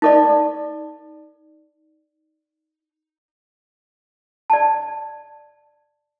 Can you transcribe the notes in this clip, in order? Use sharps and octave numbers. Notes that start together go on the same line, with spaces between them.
D#4 A4 D5
D5 A5